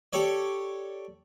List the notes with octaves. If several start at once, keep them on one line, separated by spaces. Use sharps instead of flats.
G4 A4 C#5 D5